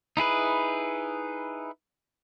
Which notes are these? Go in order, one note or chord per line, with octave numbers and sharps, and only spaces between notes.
D#4 E4 G#4 B4